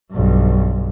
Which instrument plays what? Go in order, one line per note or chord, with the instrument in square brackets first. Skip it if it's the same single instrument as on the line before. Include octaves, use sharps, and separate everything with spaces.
[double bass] B1 G2